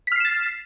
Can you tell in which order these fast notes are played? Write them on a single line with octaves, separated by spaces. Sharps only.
B6 F6 C7 E7 A6